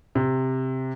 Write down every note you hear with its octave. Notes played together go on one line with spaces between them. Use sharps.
C3